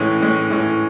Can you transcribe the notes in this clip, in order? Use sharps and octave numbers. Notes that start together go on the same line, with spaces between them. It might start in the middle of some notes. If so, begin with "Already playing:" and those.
Already playing: A2 E3 G#3 C#4
A2 E3 G#3 C#4
A2 E3 G#3 C#4